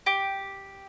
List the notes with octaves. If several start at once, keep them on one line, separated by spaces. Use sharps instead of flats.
G4